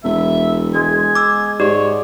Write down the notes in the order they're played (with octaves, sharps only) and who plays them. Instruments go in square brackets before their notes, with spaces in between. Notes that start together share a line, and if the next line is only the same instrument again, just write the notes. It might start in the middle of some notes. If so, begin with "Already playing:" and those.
[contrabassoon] E1 [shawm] E5
[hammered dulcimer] G#3 [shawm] G#5
[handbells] D6 E6
[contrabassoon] G#2 [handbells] G4 [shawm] C#5 [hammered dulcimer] D5